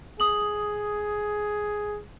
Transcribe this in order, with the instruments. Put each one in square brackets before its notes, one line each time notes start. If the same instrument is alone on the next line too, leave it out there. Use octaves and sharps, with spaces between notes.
[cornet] G#4 [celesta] D#6 F#7